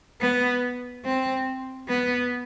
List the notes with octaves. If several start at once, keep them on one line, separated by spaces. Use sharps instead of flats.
B3
C4
B3